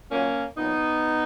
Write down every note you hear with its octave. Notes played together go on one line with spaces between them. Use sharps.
A#2 F#3 A#3 C#4
A#2 F#3 B3 D#4